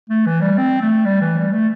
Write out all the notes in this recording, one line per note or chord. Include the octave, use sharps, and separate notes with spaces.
A3
E3
G3
C4
A3
G3
E3
G3
A3